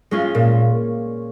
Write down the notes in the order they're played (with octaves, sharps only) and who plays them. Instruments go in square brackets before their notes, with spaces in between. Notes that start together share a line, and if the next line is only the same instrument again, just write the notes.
[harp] G#3 C#4 F4
A#2